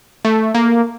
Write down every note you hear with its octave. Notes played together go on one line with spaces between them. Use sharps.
A3
A#3